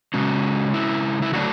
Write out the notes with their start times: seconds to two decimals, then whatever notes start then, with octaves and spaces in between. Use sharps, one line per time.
0.14 C#3 G#3 C#4 F#4
0.74 E4
1.22 E4
1.33 D3 F#3 A3 D4 F#4